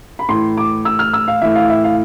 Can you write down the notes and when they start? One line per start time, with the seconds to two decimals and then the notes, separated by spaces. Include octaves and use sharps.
0.19 B5
0.29 A2 E3 C6
0.58 D6
0.85 E6
0.99 F6
1.13 E6
1.28 F5
1.42 A2 E3 E5
1.55 F5
1.70 E5
1.84 F5